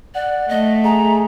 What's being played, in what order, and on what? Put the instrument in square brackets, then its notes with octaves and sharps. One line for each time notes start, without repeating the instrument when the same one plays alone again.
[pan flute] D5 [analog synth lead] F#5
[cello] A3 [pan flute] D#5
[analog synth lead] G#4 [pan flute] A#5